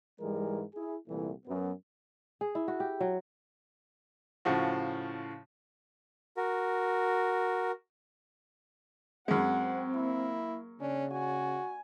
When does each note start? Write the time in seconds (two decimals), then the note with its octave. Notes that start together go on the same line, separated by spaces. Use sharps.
0.20 G#2 E3 G3 G#3 A#4
0.75 E4 G#4
1.08 C2 A#2 E3 A3
1.46 F#2 B3
2.41 G#4
2.55 E4
2.68 F#4
2.80 G4
3.00 F#3
4.45 A2 C#3 F3 F#4
6.37 F#4 A#4
9.28 F#2 G#3 C4 F#5
9.95 A#3 E4
10.80 C#3 C#4 D4
11.12 F#4 G#5